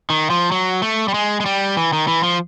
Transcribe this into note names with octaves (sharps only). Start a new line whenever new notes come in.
D#3
F3
F#3
A3
G3
G#3
G#3
G3
E3
D#3
E3
F3